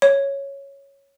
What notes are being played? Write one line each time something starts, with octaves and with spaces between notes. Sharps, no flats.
C#5